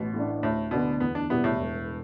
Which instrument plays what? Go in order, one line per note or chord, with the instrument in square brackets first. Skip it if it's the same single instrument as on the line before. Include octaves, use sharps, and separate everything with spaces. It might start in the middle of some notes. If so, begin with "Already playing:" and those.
Already playing: [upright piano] A1 [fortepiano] B2
[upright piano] A2 A3 D4
[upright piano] D2 [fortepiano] A2
[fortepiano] B2 [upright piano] D3 B3 D4
[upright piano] E2 [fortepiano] B3
[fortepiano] D4
[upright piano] B2 G3 E4 [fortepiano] B3
[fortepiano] A2
[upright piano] E1